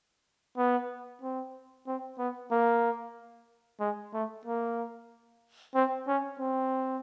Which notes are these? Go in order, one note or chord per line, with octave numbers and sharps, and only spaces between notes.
B3
C4
C4
B3
A#3
G#3
A3
A#3
C4
C#4
C4